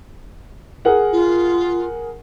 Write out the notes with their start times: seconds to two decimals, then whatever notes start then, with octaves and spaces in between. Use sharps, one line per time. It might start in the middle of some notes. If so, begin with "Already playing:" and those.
0.85 G#4 A#4 F#5
1.12 F4